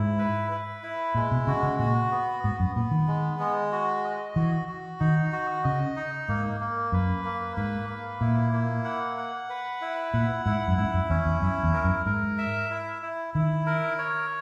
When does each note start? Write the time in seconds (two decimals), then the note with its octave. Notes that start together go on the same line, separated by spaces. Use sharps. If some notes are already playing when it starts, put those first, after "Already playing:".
Already playing: G#2 E4
0.19 B4
0.51 B4
0.83 E4
1.15 A#2 G#3
1.31 B2
1.47 C#3 F#4
1.63 C#3
1.79 A#2 F#4
2.11 B3
2.44 G#2 B3
2.60 F#2
2.76 A#2 B3
2.91 D#3
3.07 G#3
3.39 G#3
3.72 F#4
4.04 D#5
4.36 E3 F#4
4.68 F#4
5.00 D#3 D#4
5.33 F#4
5.64 C#3 D#5
5.96 D#4
6.28 G#2 A#3
6.60 A#3
6.92 F#2 B4
7.25 A#3
7.57 G#2 B4
7.89 A#3
8.21 A#2 E4
8.53 A#3
8.85 F#5
9.18 F#5
9.50 B4
9.81 E4
10.14 A#2 F#5
10.46 G#2 E4
10.68 F#2
10.77 G#2 E4
10.94 F#2
11.10 E2 C#4
11.25 E2
11.42 F#2 E4
11.63 E2
11.74 A#4
11.84 F#2
12.06 G#2 A#4
12.38 E5
12.70 E4
13.02 E4
13.34 D#3 E4
13.66 A#4
13.98 C#5